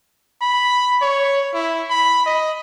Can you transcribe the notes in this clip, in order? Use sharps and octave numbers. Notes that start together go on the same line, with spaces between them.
B5
C#5
E4
B5
D#5